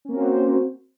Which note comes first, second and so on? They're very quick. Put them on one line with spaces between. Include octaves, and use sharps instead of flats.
C#4 A#3 C4 F#4 C5